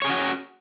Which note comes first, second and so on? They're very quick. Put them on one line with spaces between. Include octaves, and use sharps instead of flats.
C#5 G#4 C#4 F#4